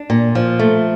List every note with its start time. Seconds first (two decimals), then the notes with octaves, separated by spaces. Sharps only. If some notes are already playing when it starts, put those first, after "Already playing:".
Already playing: D4
0.10 A#2
0.35 F3
0.59 A3